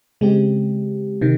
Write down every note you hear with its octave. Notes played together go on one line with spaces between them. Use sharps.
C#3 G#3 C4 G4
C3 D#3